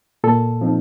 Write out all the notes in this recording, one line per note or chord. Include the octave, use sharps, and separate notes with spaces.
A#2 A4
F3 C4 D#4